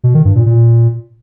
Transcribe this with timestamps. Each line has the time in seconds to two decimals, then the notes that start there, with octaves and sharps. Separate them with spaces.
0.04 B2
0.14 D#3
0.25 G2
0.35 A#2
0.46 A#2